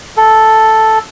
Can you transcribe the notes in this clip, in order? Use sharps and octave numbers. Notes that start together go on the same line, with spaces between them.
A4